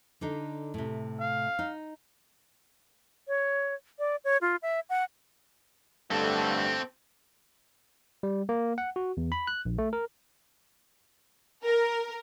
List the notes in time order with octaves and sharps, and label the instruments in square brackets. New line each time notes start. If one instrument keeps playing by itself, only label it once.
[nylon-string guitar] D3 D4 D#4
A2 C3
[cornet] F5
[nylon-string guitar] D#4
[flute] C#5
D5
C#5
F4
E5
F#5
[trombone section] G2 D3 A3 [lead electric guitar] C4 A4
[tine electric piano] G3
A#3
F#5
F#4
E2
B5
F#6
A#1
A3
A#4
[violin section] A#4